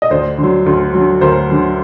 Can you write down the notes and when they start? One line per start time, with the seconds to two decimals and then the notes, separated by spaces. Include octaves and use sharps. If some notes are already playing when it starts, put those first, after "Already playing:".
0.02 D#5
0.10 D2 C5 D5
0.38 D3 F#3
0.66 D2
0.94 D3 F#3
1.21 D2 A#4 C5
1.49 D3 F#3